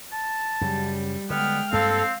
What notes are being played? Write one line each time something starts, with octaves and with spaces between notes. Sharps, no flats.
A5
F#2 C#3 F#3 G3
D3 G3 G#3 B3 G5 F6
G2 A#3 C4 A4 F5